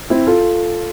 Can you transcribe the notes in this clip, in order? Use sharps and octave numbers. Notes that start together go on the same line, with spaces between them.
C4 E4
F4 A4